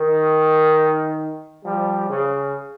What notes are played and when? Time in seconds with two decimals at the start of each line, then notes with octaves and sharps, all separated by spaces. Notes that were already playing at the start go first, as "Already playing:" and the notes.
Already playing: D#3
1.65 F3 G3
2.09 C#3